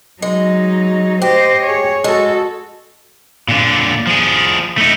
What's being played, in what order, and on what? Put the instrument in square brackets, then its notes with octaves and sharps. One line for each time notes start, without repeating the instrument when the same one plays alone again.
[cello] F#3 D#4 [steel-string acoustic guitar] G#3
[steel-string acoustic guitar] G4 [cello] C5 D#5
[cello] G#4 C#5
[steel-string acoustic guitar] G#3 [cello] F#4 A4
[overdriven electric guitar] A#2 D3
F3 G#4
A3 D#4